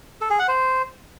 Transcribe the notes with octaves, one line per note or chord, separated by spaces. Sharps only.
A4
G#4
F#5
C5